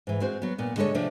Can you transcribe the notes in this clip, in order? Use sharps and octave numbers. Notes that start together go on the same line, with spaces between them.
G#2 E3
G#3 C4 F#4 C5
F#3 B3
A#2 B3
D3 G#3 A4 A#4 C#5
C3 F3 A3 D4